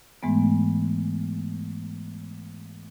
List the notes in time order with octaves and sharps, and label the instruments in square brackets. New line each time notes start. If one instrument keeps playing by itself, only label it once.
[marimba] G#2 E3 G#3 A3 B3